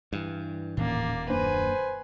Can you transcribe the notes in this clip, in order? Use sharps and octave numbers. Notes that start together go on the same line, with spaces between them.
G2 E3
D#1 A2 E3 A#3 C#4 D5
F#2 A#3 D4 B4 C5 G#5